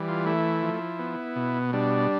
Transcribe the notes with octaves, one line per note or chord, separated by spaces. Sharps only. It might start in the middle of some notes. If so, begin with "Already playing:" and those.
Already playing: E3 G3
F4
A3 E4
F3
B3
B2
G3 D4